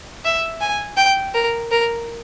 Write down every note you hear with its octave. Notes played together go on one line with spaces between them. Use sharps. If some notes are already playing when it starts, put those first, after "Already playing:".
E5
G#5
G5
A#4
A#4